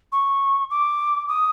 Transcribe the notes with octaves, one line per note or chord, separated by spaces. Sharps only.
C#6
D6
D#6